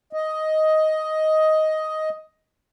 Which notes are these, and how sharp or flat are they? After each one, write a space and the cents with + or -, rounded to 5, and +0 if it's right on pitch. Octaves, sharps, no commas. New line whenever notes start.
D#5 +10